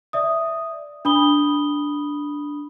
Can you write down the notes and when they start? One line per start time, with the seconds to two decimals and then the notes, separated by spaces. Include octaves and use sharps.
0.13 D5 E5 D#6
1.05 D4 B5 D#6 G7